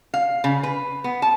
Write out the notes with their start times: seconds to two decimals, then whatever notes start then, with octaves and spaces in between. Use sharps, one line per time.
0.14 F5
0.44 C#3
0.63 B4
1.04 B3
1.22 A5